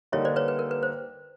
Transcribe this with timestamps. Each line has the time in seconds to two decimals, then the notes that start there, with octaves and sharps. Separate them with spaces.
0.12 D3 G3 A#3 D#4 C#5 D#5
0.25 C5 D5
0.36 B4 C#5
0.48 B4
0.59 A#4
0.71 B4
0.83 C5